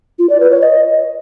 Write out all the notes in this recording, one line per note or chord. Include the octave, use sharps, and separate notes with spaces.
F4
D5
B4
C#5
D#5